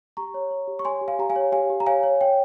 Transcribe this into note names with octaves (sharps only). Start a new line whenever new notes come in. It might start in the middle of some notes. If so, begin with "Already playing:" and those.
G4 A#5 C#6
C#5
C#5
G4
C#6
C#5 G#5 C6
G4
F5 G#5
G4 A#5
F5 G#5
C#5
G4 F5 G#5
G4
A#5
C#5 F5 G#5
C#5
C#5 G5